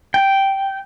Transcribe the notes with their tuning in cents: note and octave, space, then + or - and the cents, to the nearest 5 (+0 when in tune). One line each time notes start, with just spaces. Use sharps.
G5 -5